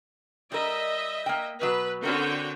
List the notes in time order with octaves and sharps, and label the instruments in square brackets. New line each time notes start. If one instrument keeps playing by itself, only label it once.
[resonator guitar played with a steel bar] G3 A#4 [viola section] D#5 E5
[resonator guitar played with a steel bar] A#3 G5
[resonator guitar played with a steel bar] B2 F#3 F#4 [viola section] B4
[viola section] D3 F#4 G5 [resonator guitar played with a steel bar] C4 C#4 A#4